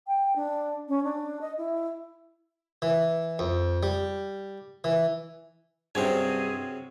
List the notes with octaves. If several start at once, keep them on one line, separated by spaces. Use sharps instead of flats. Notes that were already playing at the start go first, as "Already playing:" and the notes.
G5
D4
C#4
D4
D#5
E4
E3
F2
G3
E3
G2 C3 F#3 C4 C#4 G#4 G#5